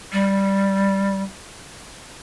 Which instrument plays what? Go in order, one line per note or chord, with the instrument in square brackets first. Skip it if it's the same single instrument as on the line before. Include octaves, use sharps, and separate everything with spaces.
[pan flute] G3